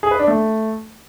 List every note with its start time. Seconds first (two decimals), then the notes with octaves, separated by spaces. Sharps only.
0.03 G#4
0.11 B4
0.19 D4
0.28 A3